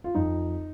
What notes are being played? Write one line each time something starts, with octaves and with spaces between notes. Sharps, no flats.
F4
F2 D#4